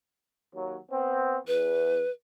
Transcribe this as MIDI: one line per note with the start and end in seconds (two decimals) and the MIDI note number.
0.55 0.77 39
0.55 0.77 54
0.91 1.37 59
0.91 1.37 60
1.47 2.03 40
1.47 2.10 71